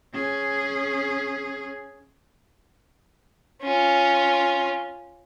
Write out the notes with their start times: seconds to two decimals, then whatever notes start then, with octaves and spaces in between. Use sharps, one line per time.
0.14 C#4 G#4
3.63 C#4 F4